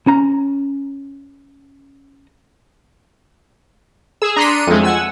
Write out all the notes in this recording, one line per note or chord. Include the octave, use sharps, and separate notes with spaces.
C#4 A#5
G#4 E6
D4 A#5 C6 B6 C#7 D#7
F2 D#3 F#3 G#3 A3
F#5 G#5 E6